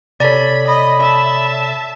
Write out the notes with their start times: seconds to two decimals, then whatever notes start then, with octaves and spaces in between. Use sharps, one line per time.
0.20 C3 A4 C#5 D5 B5
0.67 D#5 B5
1.00 E5 A5